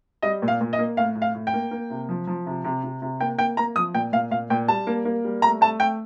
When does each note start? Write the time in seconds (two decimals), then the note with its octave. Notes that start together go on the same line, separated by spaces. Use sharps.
0.22 G3 D#5
0.42 A#2
0.48 F5
0.61 A#2
0.73 D#5
0.79 A#3
0.97 A2 F5
1.15 A2
1.22 F5
1.34 A2
1.47 G5
1.54 A#3
1.71 A#3
1.90 C3
2.09 F3
2.27 F3
2.46 C3
2.64 C3
2.84 C3
3.02 C3
3.20 A#3 G5
3.38 A#3 G5
3.57 A#3 A#5
3.76 F3 D#6
3.94 A#2 G5
4.13 A#2 F5
4.31 A#2 F5
4.50 A#2 G5
4.68 G3 A5
4.87 A#3
5.05 A#3
5.25 G3
5.42 A3 A#5
5.61 A3 A5
5.80 A3 G5